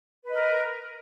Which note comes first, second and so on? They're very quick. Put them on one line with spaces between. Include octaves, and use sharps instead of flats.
B4 D#5 A#4